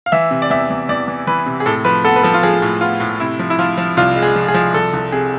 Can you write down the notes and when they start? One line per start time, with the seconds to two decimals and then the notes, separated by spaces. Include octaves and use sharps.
0.06 F5
0.12 E3 E5
0.31 C3
0.42 D5
0.50 E2 E5
0.70 E2
0.89 E2 D5
1.08 E3
1.27 E3 B4
1.46 C3
1.60 G#4
1.66 A2 A4
1.85 F3 B4
2.04 B3 A4
2.16 B4
2.23 F3 A4
2.34 F4
2.43 F3 G#4
2.62 A2
2.81 B3 F4
3.00 A2
3.20 C3 E4
3.39 F3
3.50 E4
3.59 F3 F4
3.78 F3
3.97 C2 F4
4.16 G#3
4.22 G#4
4.36 F3
4.48 G#4
4.54 F3
4.74 C2 A4
4.94 C2
5.12 C3 G#4